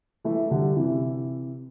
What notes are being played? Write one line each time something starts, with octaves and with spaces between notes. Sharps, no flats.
E3 A3
D3 G3
C3 E3